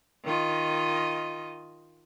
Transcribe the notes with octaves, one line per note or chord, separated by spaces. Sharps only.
D#3 F4 D#5